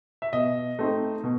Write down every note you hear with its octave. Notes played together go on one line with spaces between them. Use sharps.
E5
B2 D#5
A3 C4 D#4
B2